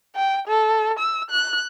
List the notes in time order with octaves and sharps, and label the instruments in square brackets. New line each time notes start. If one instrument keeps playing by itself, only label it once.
[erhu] G5
A4
E6
F#6